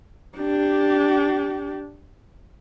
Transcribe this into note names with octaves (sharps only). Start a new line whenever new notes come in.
D4 G4